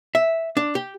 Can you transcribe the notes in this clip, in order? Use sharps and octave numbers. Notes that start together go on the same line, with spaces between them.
E5
D4
G4